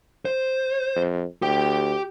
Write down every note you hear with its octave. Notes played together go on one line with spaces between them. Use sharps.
C5
F2
D2 G4 G5